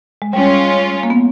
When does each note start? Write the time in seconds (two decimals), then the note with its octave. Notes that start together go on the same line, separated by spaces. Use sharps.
0.22 G#3
0.33 G3 G#3 C#4 F4
1.03 A#3
1.10 B3